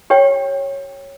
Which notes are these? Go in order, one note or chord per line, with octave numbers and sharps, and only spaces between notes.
G4 C#5 G5